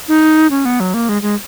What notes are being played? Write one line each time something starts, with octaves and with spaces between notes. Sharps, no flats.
D#4
C#4
B3
F#3
A#3
G#3
G#3